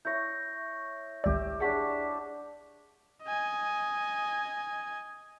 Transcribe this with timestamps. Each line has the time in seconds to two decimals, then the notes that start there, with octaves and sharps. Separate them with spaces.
0.05 E4 C#5 G6 A#6
1.24 G#1 C#2 G4 D5 E5
1.60 D4 G#4 C#5 F#5 A5 B6
3.23 D#5 G#5